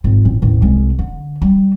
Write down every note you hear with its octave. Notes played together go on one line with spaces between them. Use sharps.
G#1 F4
A1
A1 D#2
C2 G#3
D3
G3